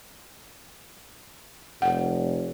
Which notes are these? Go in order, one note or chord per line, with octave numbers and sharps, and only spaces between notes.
F1 F#5